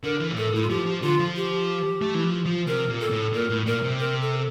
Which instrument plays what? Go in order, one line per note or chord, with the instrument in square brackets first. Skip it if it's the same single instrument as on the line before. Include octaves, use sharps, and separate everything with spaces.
[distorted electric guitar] D3 [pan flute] A#4
[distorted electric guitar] E3
A#2
[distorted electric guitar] A2 [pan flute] A4
[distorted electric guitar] A2 [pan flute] E4
[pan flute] F4
[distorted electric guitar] F3 [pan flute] G4
[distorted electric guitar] F3
[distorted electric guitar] D3 [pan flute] F4
[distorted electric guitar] F3
[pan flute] G4
[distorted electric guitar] A3
E3
F3
F3
[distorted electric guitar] C3 [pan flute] A#4
[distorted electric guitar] A#2
[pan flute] A4
[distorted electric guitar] A2
[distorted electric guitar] A#2 [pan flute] A#4
[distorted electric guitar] A2
[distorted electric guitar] A#2 [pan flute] A#4
[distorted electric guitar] C3
[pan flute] A#4
A4